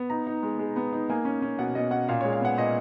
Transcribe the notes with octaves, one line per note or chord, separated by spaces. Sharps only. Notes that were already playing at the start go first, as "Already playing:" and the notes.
Already playing: B3
D#4 A#5
D#4
G#3
G#3
B3
D#4
A#3 G#5
C#4
C#4
B2 F#5
B2 D#5
C#4 F#5
A#2 F5
G#3 C#5
F5
B3 F#5
A#2 D#5